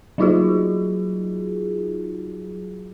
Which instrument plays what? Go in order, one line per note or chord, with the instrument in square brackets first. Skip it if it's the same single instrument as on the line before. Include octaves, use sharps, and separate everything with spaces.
[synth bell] F#3 G3 D#4 F4 F#4 G#4